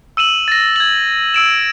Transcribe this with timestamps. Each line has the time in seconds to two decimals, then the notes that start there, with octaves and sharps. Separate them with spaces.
0.17 E6 D#7 E7 F#7
0.48 A6 A#6
0.76 G#6 F#7
1.34 E6 D7 E7